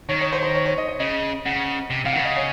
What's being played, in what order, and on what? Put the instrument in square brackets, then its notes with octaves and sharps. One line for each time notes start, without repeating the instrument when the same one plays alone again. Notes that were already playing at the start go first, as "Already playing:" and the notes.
[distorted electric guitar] D#3 [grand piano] C#5
[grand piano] C#5
C5
C5
C#5
C#5
D#5
D#5
[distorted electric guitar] C#3 [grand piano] D#5
[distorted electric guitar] C#3 [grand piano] F#5
[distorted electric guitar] C3
[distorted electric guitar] C3 [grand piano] F5
[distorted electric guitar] D#3 [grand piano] F#5
[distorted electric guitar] C#3 [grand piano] D#5
[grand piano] C#5